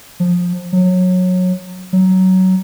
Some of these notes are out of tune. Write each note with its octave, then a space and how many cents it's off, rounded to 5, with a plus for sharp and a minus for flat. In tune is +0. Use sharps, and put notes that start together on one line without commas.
F3 +20
F#3 -20
F#3 +15